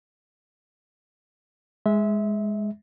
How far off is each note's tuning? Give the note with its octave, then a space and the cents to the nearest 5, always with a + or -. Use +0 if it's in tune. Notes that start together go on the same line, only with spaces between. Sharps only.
G#3 +0 E5 -20